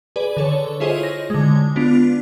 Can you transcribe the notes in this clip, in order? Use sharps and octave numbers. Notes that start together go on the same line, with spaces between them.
G#4 B4 D5
D3 A4 C#5
E4 F4 G#4 C5 C#5 D#5
A#6
D3 G#3
B3 D4 F4